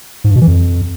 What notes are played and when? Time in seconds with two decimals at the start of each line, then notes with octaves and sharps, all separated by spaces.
0.24 G#2
0.30 G2
0.36 B2
0.42 E3
0.47 F2